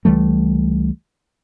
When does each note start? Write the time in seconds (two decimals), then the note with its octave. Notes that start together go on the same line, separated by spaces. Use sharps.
0.05 C#2 E3 G3 A3